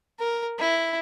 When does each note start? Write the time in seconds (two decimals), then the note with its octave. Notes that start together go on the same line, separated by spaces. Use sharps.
0.19 A#4
0.59 E4